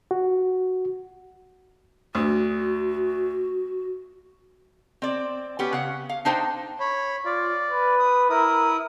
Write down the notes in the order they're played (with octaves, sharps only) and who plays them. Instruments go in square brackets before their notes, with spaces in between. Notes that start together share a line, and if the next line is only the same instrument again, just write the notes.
[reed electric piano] F#4
[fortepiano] D2 [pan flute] F#4
[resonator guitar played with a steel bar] C4 D5
B3 C#4 G4
C#3 F#5
F5
D4 D#4 C5 G5
[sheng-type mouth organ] C#5 B5
[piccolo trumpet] F4 [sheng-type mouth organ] D5
[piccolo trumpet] B4
[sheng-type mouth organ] D#6
[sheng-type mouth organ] E4 D#6 [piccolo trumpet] A#4